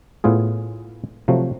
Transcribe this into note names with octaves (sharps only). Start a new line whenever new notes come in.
A2 B3 F4 G#4
C3 F3 F#3 A3